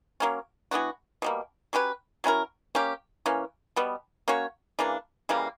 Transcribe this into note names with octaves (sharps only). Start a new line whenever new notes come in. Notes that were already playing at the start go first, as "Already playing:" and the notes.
F#3 A#3 C#4
E3 B3 D4 F#4
B2 G3 A#3
F#3 C#4 G4 B4
F#3 C#4 E4 A#4
A#3 C#4 G4
E3 A#3 C#4
B2 G3 B3
A#3 C#4 F#4 C#5
C#3 E3 A#3 D4
C#3 E3 G3 A#3